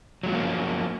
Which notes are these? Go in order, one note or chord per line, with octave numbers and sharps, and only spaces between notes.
F3 F#3 G#3 A#3 B3